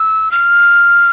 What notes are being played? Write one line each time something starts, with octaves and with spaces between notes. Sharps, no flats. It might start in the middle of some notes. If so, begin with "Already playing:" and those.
Already playing: E6
F6